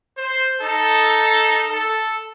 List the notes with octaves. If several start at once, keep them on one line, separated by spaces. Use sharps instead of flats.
C5
D#4 A4
A4